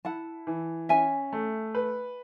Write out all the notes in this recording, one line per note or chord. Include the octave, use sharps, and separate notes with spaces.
E4 F#5 A5
E3
C#4 E5 G#5
A3
B4